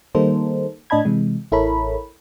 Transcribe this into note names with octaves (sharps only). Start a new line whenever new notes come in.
D#3 G3 A#3 D#4 A4 C5
A2 D4 D#5 A5 B5 G#6
C3 E3 G#3
A1 E4 A4 A#4 C#5 B5